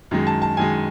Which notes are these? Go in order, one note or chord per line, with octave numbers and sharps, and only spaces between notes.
F#2 D#3 G#3
A5
A5
F#2 D#3 G#3 G#5